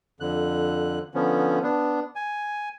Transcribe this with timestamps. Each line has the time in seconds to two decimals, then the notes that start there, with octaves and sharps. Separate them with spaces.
0.20 F2 D3 F#6
1.14 D3 F3 B3 C#4
1.63 B3 D4
2.15 G#5